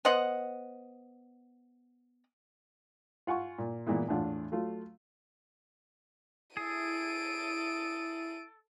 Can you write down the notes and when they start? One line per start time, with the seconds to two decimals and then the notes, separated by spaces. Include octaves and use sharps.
0.05 B3 C5 D#5 F#5
3.27 F4 F#5 G#5 C#6
3.58 A#2
3.87 A#2 E3 G#3 B3 E4
4.08 E2 A2 D4 F4 F#5
4.52 F#3 A3 F4
6.57 E4 G#4 A4 D7 D#7